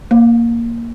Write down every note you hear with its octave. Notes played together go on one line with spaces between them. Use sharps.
A#3